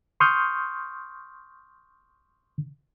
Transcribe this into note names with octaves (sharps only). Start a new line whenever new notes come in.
C6 C#6 D#6 F6 G6